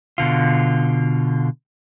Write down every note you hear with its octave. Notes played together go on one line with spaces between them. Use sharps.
B2 D3 F4